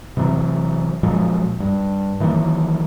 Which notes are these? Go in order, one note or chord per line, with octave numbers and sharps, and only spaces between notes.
C3 E3 F#3
A#2 F3 F#3 G#3
G2
D#3 E3 F#3 A#3